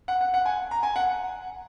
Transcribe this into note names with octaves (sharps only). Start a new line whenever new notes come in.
F#5
F#5
F#5
G#5
A#5
G#5
F#5